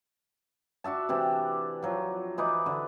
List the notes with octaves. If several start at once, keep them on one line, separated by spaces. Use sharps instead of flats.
D4 F#4 E5 A5
C3 E3 D4 G4
F3 F#3
E3 D#4 B4 D5
D3